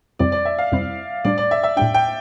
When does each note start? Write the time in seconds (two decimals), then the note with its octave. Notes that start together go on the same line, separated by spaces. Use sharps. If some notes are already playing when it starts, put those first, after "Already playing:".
0.19 F2 C3 G3 C4 E4 D5
0.32 D5
0.45 E5
0.59 F5
0.72 F2 C3 G3 C4 E4
1.25 A2 G3 D4 D5
1.38 D5
1.51 E5
1.63 E5
1.76 A2 G3 D4 G5
1.94 G5